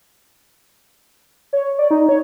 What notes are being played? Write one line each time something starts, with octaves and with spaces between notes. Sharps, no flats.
C#5
D5
D#4
C#5